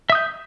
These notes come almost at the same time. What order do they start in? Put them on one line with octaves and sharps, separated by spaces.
E5 D#6 G6